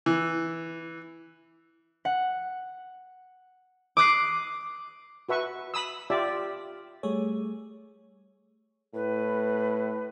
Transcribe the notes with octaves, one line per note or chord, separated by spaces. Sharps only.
E3
F#5
D6 D#6 F#6 C7
F#4 B4 E5 C#6
B5 D#6 E6
F4 G4 D5 E5
G3 A3 G#4 C#5
A2 B4